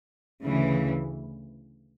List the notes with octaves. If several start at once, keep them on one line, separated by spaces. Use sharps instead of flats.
D2 C#3 E3